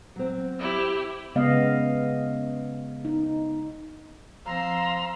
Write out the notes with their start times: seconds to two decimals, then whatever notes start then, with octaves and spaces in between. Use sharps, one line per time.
0.16 F#3 C4
0.59 E4 G4
1.35 C#3 G#3 B3 D#5 F5
3.05 D#4
4.46 F3 C4 F5 A#5 C6 E6